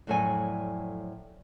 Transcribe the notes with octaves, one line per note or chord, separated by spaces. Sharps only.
F2 A2 F#3 A4 D5 G#5